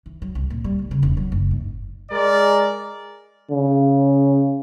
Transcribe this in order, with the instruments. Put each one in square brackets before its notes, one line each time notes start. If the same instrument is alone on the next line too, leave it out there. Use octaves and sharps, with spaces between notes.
[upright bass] E3
F#3
C2
A#2
G3
D2
C#3
E1
F#3
F#1
G#2
[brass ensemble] G#3 A#4 D5
[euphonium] C#3